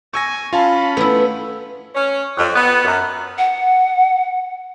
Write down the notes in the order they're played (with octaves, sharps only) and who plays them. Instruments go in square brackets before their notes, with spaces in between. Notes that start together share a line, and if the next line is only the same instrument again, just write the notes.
[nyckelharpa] G#5 [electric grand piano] C#6 E6 A#6
[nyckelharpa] C#4 B5 [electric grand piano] F4 F5 A5
[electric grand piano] A3 [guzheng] B3 E4
[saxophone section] C#4
F2
B3
F#2
[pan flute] F#5